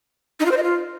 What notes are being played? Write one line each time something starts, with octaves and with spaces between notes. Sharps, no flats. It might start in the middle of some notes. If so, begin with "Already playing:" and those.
D#4
F4
C5
D#5
F4